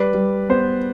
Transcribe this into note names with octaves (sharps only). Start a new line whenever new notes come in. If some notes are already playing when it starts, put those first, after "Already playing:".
Already playing: G3 B4 D5
G3
B3 C5